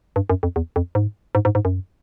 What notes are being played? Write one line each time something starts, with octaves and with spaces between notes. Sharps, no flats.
G2
F#2
F2
E2
F2
G#2
G#2
G#2
G#2
F#2